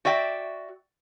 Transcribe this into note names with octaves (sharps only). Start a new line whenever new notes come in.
F#4 D5 E5 G5